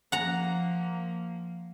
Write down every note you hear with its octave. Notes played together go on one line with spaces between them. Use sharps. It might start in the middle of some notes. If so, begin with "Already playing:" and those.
F3 A#3 F#5 A#5